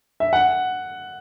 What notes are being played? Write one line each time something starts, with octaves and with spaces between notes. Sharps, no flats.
E5
F#5